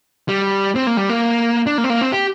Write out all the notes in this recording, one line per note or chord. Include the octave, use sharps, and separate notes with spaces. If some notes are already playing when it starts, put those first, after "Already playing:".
G3
C4
A#3
G3
A#3
D4
A#3
C4
A#3
C4
G4